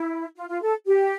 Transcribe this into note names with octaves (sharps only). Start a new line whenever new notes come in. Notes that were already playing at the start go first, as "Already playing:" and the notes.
Already playing: E4
F4
F4
A4
G4